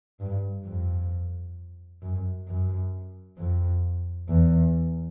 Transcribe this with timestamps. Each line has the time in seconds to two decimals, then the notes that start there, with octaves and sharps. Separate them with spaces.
0.20 G2
0.66 F2
2.02 F#2
2.48 F#2
3.38 F2
4.29 E2